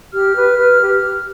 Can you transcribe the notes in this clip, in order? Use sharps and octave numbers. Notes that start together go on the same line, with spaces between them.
G4 F6
B4
B4
G4